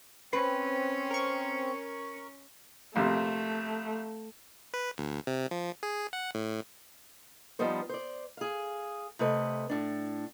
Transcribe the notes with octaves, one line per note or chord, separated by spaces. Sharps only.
C4 C#4 B4
A#4 C#6
A#1 C3 A3
B4
D2
C3
F3
G#4
F#5
A2
F3 G3 B3 D#4 C5
C5 D5
G#4 F5
C3 A3 B4 D#5
A2 D4